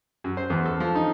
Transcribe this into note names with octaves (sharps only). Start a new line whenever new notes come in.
F#2
C5
E2
A4
F3
D#4